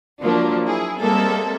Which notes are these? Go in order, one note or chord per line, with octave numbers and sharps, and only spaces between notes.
F3 F#3 A#3 D4
E4 G#4
G3 G#3 A#3 C4 A4 E5